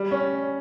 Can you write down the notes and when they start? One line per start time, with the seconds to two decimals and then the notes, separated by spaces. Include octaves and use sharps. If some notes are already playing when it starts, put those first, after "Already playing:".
Already playing: G3
0.11 C#4